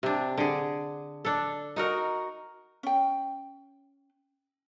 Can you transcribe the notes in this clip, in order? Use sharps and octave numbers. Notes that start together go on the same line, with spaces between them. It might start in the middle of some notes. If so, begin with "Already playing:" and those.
C3 D4
D3 G#4
D4 A4
D#4 F#4 A#4
C#4 G5